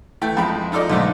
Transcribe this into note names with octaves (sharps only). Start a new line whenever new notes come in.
E3 A3 G5
F2 G#3 G5 B5
D#4 F4 A4 D5 D#5
B1 G#2 D3 G#3 A3